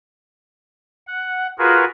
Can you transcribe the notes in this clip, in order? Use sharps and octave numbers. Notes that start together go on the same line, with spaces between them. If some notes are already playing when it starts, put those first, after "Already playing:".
F#5
F4 F#4 G#4 A#4 B4